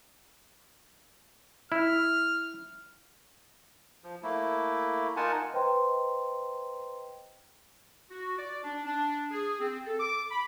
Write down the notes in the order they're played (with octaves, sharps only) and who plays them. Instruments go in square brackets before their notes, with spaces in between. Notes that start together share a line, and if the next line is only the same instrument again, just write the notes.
[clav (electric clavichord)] E4 [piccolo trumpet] F6
[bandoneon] F3
A3 A#3 E4
D#4 F4 A#4 F#5 G#5 A5
[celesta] B4 C5 D#5 G5 A#5 C6
[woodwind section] F#4
D5
D4
D4
G#4
C4
A4
D6
B5